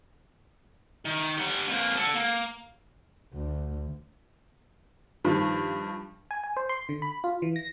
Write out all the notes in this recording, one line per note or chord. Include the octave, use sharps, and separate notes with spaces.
D#3
G3 F#5
F2 A#3
A4 F#5
A#3
D2
G2 D#3 F3
G#5
G#5
C5
C6
D3
B5
F4
E3
A#6